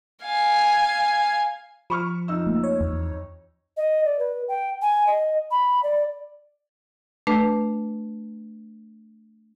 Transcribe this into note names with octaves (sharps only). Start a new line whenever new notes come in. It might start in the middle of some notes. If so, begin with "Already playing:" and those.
F5 G#5
F3 B5 C#6 F6
F2 D#4 E6
A3 A#3
C#5
E2
D#5
D5
B4
G5
G#5
D#5
B5
D5
A3 D4 B4